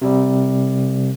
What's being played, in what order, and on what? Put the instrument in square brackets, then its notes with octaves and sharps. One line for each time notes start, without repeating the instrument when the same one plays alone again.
[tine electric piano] C3 G3